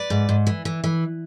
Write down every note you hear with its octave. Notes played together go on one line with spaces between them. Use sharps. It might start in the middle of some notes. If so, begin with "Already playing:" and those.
Already playing: B4 D5
G#2
G#2
E3
E3
E3